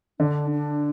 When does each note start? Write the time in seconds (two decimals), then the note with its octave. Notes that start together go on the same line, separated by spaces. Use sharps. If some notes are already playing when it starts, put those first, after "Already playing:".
0.19 D3 D4
0.50 D4